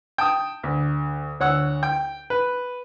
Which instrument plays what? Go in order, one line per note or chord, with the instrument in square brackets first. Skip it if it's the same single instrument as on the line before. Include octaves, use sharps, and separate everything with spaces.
[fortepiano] G5 A5 D#6
D2
D2 C#5 F#5 E6
G5
B4